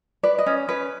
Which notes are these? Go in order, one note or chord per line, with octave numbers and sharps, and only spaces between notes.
B4 D5
D#5
C#4
C#4 B4